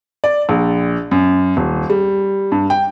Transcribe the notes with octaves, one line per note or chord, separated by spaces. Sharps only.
D5
A#1
F#2
D#1
G3
G2
G5